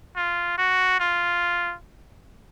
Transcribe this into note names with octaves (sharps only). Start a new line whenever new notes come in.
F4
F#4
F4